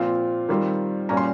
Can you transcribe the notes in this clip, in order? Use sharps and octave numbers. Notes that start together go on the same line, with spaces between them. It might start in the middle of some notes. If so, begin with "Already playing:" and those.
Already playing: A#2 F3 C4 F4
D#3 G3 C4 F4
A#2 G3 C#4 A#5
C6